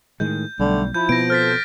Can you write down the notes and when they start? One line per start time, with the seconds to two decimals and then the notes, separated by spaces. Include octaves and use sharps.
0.20 A2 D#3 G#3 G6
0.60 B1 D3 G3 A3
0.94 F3 E4 G6
1.09 B2 B3 C4 A#6 D7
1.30 A4 C5 F6 A6 B6